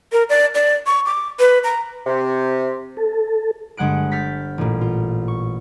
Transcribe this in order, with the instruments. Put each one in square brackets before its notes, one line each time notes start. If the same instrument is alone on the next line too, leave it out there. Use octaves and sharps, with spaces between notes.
[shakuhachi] A#4
D5
D5
C#6
D6
B4
A#5
[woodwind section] C3
[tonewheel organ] A4
[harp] G1 G#3 F#5 F#6 D7
F6 G6 A6 B6 C#7
A1 A#2
F4
C#6